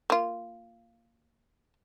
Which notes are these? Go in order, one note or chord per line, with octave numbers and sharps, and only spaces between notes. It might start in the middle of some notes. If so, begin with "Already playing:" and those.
A#3 F4